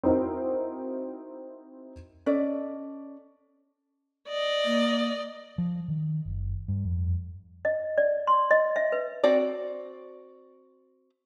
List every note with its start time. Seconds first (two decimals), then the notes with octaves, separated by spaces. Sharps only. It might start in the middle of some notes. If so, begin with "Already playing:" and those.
0.03 C4 D#4 E4 F#4 A#4
2.26 C#4 A4 D5 D#5
4.28 D5 D#5
4.65 A#3
5.58 F3
5.88 D#3
6.25 F#1
6.68 G2
6.84 F2
7.65 D#5
7.98 D5
8.27 C6
8.51 D#5
8.76 E5
8.92 B4
9.24 C4 F#4 D5